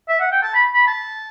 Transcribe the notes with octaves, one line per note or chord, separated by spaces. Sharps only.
E5
F#5
G5
A5
B5
B5
A5